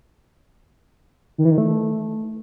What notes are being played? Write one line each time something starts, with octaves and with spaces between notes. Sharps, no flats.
D#3
E3
D#3
A3